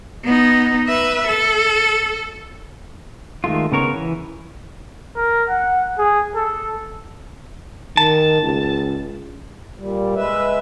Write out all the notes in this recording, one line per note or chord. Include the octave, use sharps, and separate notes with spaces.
B3 D#4
B4 E5
A4
D#3 G#3 A3 F4
C#3 B3 A#4 C#5
E3
A#4
F#5
G#4
A4
D#3 A5
C#2
A#2 G3
G#3 B4 E5